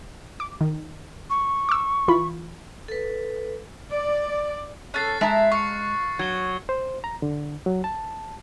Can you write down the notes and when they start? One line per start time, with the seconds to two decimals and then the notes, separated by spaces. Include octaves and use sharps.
0.40 D6
0.61 D#3
1.30 C#6
1.69 D6 E6
2.08 E3 F4 B5
2.88 A4 B4
3.89 D5
4.94 C#4 A4 F#6 A6 C7
5.21 G#3 E4 A5 A#5
5.52 F5 C#6 C#7
6.19 F#3 G#6 G7
6.69 C5
7.04 A#5
7.22 D3
7.66 F#3
7.84 A5